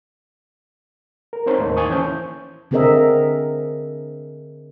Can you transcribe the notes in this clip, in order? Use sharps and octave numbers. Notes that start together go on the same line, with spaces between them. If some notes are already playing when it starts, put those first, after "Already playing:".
A#4
C4 D#4 C5 C#5 A5 A#5
D#2 A2 A#3 D#4
G#5 A5 C#6 D#6
E3 C#4 C5 G6
D3 C4 G#4 A#4 D#5 E5